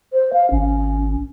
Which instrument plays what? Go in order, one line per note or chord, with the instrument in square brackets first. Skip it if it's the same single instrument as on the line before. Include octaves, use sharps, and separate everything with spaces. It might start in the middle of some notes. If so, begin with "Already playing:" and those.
[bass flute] C5
F5
[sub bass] G#1 [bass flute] C#4